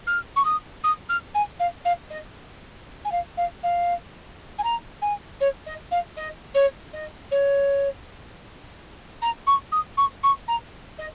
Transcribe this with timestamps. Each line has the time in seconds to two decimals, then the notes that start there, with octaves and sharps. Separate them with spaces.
0.07 F6
0.36 C#6
0.45 D#6
0.84 D#6
1.09 F6
1.35 G#5
1.60 F5
1.85 F5
2.10 D#5
3.05 G#5
3.12 F5
3.37 F5
3.63 F5
4.59 G#5
4.64 A#5
5.02 G#5
5.41 C#5
5.66 D#5
5.91 F5
6.17 D#5
6.54 C#5
6.93 D#5
7.31 C#5
9.22 A#5
9.47 C#6
9.72 D#6
9.97 C#6
10.23 C#6
10.48 A#5
10.99 D#5